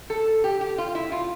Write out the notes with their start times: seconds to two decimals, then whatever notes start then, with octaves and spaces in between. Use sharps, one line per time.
0.10 A4
0.44 G4
0.61 G4
0.78 F4
0.95 E4
1.12 F4